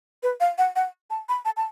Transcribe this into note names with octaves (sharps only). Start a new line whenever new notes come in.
B4
F5
F#5
F#5
A5
B5
A5
A5